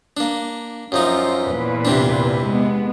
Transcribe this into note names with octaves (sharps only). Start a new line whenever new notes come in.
A#3 D4
F#2 F3 D#4 F4
E2 A#2 B4
C3 C4 D4
G#3 B3